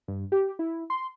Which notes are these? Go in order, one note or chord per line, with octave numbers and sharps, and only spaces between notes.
G2
G4
E4
C6